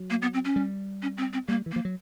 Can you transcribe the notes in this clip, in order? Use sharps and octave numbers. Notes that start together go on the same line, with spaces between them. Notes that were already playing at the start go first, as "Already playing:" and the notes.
Already playing: F#3
A#3
B3
C4
C#4
G3
C#4
C4
C4
G3 A#3
E3
A#3
F3
F#3